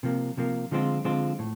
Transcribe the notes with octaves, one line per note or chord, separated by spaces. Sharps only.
C3 F3 A#3
C3 F3 A#3
D3 F3 G#3 C4 F4
D3 F3 G#3 C4 F4
A2